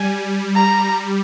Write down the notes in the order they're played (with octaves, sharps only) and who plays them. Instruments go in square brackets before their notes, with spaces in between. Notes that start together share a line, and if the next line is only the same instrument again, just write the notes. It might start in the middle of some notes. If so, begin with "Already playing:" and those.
Already playing: [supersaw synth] G3 [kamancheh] G#5
[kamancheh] A#5